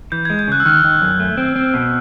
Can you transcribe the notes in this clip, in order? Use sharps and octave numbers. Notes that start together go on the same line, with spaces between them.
E3 G6
G#6
G#3
G6
C#3 F#6
E6
D#3 F6
D#3
F#2
A3
C4
C4
B2